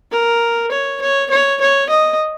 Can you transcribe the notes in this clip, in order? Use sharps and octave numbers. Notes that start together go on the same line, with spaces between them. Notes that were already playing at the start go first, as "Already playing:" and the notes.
A#4
C#5
C#5
C#5
C#5
D#5